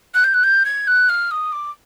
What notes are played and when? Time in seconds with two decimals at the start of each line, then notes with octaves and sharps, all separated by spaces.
0.15 F#6
0.24 G6
0.34 F#6
0.44 G6
0.65 G#6
0.87 F#6
1.09 F6
1.31 D#6
1.52 D6